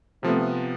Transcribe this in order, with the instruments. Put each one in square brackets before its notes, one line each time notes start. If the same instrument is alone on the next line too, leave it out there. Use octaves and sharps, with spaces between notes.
[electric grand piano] C3 F3 B3 [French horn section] A3 C4